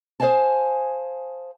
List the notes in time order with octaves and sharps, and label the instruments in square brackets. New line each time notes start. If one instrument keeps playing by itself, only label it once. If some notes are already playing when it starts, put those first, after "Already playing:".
[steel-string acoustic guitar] G#4 C5 D#5 F5 G#5 A5